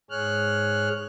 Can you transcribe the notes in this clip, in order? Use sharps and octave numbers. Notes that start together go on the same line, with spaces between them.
G#2 G#4 C#5 F6 F#6